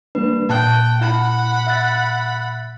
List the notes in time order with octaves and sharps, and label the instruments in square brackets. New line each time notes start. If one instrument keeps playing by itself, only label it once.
[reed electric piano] G3 A#3 D4 [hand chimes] B4
[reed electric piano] A#2 [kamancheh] G5 [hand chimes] A5 F#6
[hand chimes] E4 [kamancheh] F#5 B5
[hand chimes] E5 F#6 A6